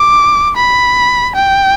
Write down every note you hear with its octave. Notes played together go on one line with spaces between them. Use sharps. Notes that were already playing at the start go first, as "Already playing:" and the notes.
Already playing: D6
B5
G5